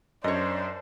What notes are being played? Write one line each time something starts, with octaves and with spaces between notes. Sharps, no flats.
F#2 D4 C5 C#5 D#5